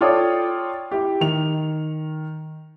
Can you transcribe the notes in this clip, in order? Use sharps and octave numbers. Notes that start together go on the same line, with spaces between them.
F4 A4 C#5 D5 G5 D#6
E4 G4
D#3 F7